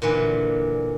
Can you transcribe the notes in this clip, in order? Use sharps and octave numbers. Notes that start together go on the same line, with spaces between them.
A#2 D3 E3